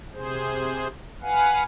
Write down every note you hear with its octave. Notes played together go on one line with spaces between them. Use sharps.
C3 G#4 C5
B4 F5 F#5 G#5